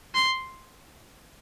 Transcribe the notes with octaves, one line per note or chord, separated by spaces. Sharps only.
C6